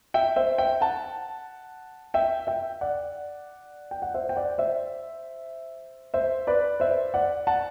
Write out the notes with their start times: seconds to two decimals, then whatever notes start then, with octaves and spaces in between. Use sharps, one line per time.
0.14 E5 G5
0.36 C5 E5
0.58 E5 G5
0.81 F#5 A5
2.14 E5 G5
2.47 E5 G5
2.81 D5 F#5
3.91 G5
4.02 F#5
4.14 C5 E5
4.29 G5
4.36 D5 F#5
4.58 C5 E5
6.14 C5 E5
6.47 B4 D5
6.80 C5 E5
7.14 D5 F#5
7.47 F#5 A5